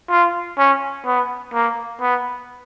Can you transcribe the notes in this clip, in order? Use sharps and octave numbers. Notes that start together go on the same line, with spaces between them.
F4
C#4
B3
A#3
B3